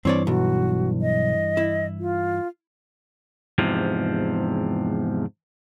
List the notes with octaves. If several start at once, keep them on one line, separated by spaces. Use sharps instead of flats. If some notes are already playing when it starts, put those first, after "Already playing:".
G2 E3 C4 C#5 D5
B1 F#4
D#5
E4
F4
E2 G#2 C3 F3